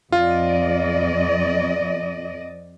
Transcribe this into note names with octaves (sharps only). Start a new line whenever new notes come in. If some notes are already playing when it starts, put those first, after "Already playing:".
F2 F4 D5 D#5